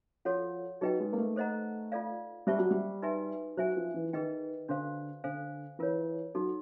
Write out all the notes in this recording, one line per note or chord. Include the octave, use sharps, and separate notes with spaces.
F3 F#4 A4 C#5 F#5
F#3 D#4 G#4 B4 D#5 G5
G#3
A#3
A3
A4 C5 D#5 F#5 A#5
F4 A4 D5 F5
G3 C5 E5 A5 C#6
F#3
G3
D#4 F#4 B4 E5 G#5
F#3 C5 E5 G#5
F3
E3
D#3 G#4 B4 D#5 G5
D3 D4 F#4 A4 C5 F5
D3 A4 C5 F5 G#5
E3 F4 A#4 C#5
F#3 D#4 F#4 A4